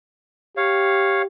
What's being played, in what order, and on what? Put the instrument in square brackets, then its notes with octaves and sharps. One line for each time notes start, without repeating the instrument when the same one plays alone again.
[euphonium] G4 [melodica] C#5 F5